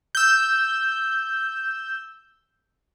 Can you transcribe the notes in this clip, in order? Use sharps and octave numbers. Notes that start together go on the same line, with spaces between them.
E6 G6